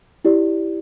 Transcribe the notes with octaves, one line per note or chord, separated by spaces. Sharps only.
E4 G4 D5